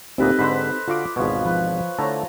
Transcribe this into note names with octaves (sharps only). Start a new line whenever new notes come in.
D2 A#2 C4 D#4 G4 A4 B4 D#5
G#2 D3 B4 C5 B5
D3 F4 F#4 F5 D6
G#1 E2 B2 F3 C#5
F3 B4
D3 A3 E4 C#5 A5 A#5